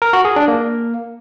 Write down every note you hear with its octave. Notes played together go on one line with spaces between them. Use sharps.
A#4
F#4
G#4
D4
A#3